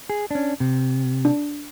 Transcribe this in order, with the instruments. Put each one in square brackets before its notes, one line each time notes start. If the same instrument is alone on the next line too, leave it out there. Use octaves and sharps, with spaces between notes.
[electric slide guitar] G#4
C#4 D4
C3
[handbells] D4